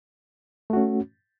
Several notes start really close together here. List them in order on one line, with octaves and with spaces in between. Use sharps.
A3 F#4 C#4